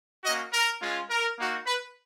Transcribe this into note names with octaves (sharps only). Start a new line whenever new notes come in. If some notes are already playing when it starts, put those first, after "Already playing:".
A#3 C#4 F#4 D#5
A#4
G#3 C#4 F4
A#4
A#3 D#4 F#4
B4